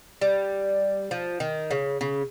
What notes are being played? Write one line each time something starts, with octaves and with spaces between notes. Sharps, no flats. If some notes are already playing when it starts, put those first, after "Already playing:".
G3
F3
D#3
C#3
C#3